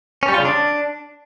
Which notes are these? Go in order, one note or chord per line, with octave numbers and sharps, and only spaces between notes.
C#4
G3
F4
C#3
D4